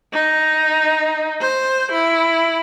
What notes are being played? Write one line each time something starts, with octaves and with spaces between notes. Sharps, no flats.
D#4
C5
E4